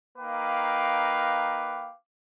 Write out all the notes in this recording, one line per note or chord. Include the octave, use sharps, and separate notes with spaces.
A#3 D#4 B4 F5 G5 D6